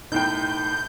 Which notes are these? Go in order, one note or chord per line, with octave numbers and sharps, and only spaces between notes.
E1 A2 D#4 G5 G6